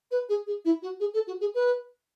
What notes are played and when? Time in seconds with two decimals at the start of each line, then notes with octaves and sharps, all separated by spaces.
0.11 B4
0.29 G#4
0.47 G#4
0.65 E4
0.82 F#4
1.00 G#4
1.14 A4
1.27 F#4
1.41 G#4
1.54 B4